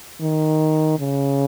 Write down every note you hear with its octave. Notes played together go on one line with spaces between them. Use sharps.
D#3
C#3